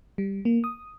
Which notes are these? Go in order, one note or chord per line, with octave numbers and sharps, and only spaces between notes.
G3
A#3
D#6